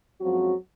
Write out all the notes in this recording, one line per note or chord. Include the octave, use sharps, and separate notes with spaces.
F#2 F3 F#3 G#3 C4 F#4